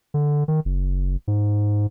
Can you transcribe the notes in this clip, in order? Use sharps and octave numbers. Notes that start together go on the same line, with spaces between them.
D3
D#3
F#1
G#2